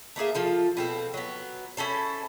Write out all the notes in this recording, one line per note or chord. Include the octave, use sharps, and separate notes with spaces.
A3 A#3 G#4 E5
F3 F4 A4
B2 C4 A4
F#3 B3
C#4 E4 A4 C5